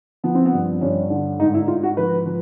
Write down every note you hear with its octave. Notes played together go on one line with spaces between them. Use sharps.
F3 B3
C4
B3
G2
G2 C#4
D3
G#2 D#4
E4
G#2 F4
F#4
F3 B4
F3